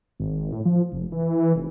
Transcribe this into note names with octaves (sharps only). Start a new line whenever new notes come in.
G#1
A2
F3
F1
E3
F1